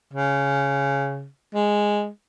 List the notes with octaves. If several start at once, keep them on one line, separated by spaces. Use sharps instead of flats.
C#3
G#3